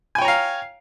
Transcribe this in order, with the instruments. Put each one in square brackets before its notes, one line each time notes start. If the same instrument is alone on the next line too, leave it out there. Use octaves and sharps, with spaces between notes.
[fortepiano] G#5
G5
C#5
A#5
F5